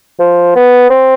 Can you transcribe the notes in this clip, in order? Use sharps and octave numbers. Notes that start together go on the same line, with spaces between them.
F3
B3
C4